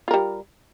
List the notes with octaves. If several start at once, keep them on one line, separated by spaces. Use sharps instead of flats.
G3 F4 A#4